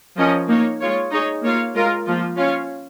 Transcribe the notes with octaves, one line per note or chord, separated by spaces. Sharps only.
F3 C#4 A#4 D#5
A#3 D#4 C#5
G#3 F4 C#5
D#4 G#4 C#5
A#3 F4 C#5 F5
G#3 F4 A#4
F3 A#3 F4
C#4 F4 C#5 F5